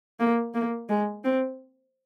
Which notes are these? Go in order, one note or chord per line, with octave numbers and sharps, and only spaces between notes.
A#3
A#3
G#3
C4